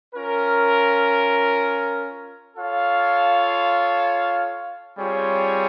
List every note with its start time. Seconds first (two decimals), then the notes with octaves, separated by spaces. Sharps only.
0.14 C#4 F4 A#4
2.56 F4 A4 C#5 F5
4.98 G3 C4 F4 G#4 C#5